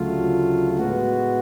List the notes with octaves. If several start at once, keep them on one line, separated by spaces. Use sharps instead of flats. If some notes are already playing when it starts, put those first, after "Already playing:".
Already playing: D2 C#3 F#3 A3 F4
A2 G#3 B3 F#4